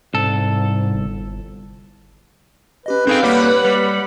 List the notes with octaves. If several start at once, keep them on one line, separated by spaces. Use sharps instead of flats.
C2 G#2 A4
G1
C#4 G4 B4 D#5
C4 D#4 G#4 A4 F5 G5 G6
G3 A#3 G4 C#5 F#5 B5 D6
G3